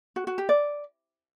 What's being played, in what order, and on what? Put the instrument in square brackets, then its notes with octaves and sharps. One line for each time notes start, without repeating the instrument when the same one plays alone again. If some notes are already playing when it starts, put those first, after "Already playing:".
[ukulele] F#4
F#4
G4
D5